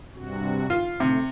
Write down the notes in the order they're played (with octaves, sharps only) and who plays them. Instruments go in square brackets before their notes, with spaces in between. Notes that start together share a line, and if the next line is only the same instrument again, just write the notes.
[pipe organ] G2 C3 F#4
[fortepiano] F4
[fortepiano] C3 [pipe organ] A3